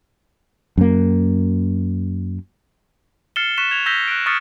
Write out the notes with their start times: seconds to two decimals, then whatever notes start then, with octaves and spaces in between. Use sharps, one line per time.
0.78 F#2 A#3
3.36 F6 A6 C7 C#7 E7 G7
3.58 C#6 F#6 B6 E7
3.71 G#6 F7
3.86 E6 G6 A#6 B6 F7 G7
4.08 F#6 D7
4.26 C#6 D#6 F6 A6 B6 C#7